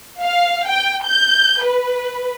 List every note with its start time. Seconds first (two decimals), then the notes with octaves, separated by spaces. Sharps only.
0.21 F5
0.68 G5
1.05 G6
1.64 B4